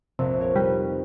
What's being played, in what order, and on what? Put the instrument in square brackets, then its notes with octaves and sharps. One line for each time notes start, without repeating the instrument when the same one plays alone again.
[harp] A#1 F2 [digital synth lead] C3
[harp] A#4 C#5
[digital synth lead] G3 [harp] C4 D#4 B4